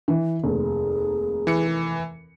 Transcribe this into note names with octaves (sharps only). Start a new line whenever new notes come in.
E3
F1 D#2 G#4
E3 C#7